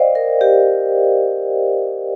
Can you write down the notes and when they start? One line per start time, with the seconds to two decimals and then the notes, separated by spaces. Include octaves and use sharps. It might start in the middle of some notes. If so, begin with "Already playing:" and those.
Already playing: C5 D5 D#5 F5 G5
0.15 A#4
0.41 G4